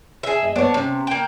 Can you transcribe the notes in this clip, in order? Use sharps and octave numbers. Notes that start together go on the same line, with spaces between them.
G#4 E5
D#5 G#5
B3 D4 C5 C#5
C3 C#4
A#3 G5